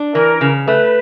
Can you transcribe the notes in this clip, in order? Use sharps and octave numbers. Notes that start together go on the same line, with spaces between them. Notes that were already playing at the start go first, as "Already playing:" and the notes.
Already playing: D4
E3 A#4
C#3
A3 B4